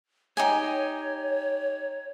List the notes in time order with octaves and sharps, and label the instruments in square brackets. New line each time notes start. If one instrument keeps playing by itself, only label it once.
[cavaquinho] D#4 G4 G#5 [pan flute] C#5